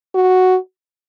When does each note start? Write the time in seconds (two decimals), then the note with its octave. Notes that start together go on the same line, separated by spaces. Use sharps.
0.14 F#4